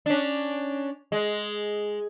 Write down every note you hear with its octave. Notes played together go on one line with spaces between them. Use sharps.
C#4 D4
G#3